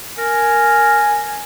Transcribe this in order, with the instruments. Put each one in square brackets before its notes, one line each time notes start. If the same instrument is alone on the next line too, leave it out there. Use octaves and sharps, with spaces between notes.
[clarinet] A#4 [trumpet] G#5